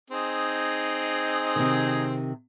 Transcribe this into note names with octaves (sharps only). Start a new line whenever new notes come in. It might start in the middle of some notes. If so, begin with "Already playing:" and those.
C4 D#4 G#4
C3 D#3